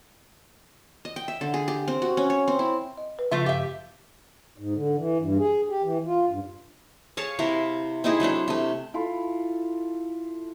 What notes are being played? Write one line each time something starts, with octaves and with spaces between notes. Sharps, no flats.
D#5
G5
E5
D3
G#4
G4
C4
F#4
C#4
C#5
C4
E4
D#5
B4
C#3 F3 A3 F4 E5
G2 G4 E5 F5
G#2
D3
E3
G2
G#4
G4
E3
F4
G2
G#4 C#5 F5 A5
C3 E4 A#4 F5
C4 D#4 E4 G#4
F#3 A3 C4 D4
C3 A3
E4 F4 A4